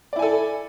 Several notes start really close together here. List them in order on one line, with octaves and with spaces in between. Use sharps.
D5 E4 G#5 A4